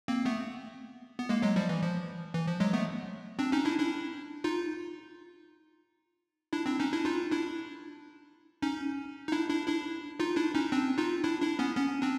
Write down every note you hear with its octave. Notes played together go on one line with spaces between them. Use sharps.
A#3 C4
A3 B3
B3
G#3 A#3
F#3 G#3
F3 G3
E3
F3
E3
F3
F#3 G#3
A3 B3
C4 D4
C#4 D#4
D4 E4
D4 E4
D#4 F4
D4 E4
C4 D4
C#4 D#4
D4 E4
D#4 F4
D4 E4
C#4 D#4
D#4
D4 E4
D4 E4
D4 E4
D#4 F4
D4 E4
C#4 D#4
C4 D4
D#4 F4
D4 E4
D4 E4
B3 C#4
B3 C#4
C4 D4